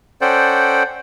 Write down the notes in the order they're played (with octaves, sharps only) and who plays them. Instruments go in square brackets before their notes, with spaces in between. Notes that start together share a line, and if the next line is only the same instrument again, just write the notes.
[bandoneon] C#4 A4 C5 D5 F#5 G5